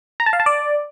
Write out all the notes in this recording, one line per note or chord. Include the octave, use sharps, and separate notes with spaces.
A#5
A5
F5
A5
D5